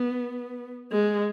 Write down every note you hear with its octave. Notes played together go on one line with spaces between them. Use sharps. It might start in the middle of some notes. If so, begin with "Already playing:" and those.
Already playing: B3
G#3